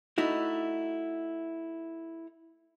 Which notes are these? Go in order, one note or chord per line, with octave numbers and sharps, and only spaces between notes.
A3 D#4 E4 F#4